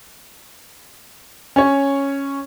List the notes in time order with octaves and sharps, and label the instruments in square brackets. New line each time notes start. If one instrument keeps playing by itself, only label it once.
[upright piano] C#4 C#5